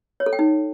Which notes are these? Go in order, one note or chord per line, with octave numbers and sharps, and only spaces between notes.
C#5
A4
G5
D#4